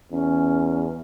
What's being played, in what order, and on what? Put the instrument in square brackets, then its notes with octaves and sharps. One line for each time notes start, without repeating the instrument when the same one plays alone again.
[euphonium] E2 [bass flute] C#4